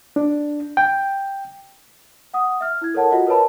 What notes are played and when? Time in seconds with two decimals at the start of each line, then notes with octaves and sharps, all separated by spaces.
0.16 D4
0.77 G5
2.34 F#5 D#6
2.61 E5 F6
2.82 E4 G#6
2.94 A4 A#4 C#5 F#5 A5
3.11 F4 F#4 D#5 F#5
3.27 A#4 B4 C#5 A5 B5